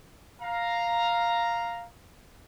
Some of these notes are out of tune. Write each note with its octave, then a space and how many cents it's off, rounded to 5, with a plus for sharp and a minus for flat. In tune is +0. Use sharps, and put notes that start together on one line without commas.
F5 +0 A#5 +0